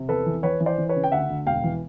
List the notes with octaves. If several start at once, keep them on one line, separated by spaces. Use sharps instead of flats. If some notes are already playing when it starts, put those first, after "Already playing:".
Already playing: C3
E2 A4 B4
E3
E3 B4 C#5
E3
C5 D5
E3
B4 C#5
C#3
G5
D2 E5 F#5
D2
E1 F5 G5
E3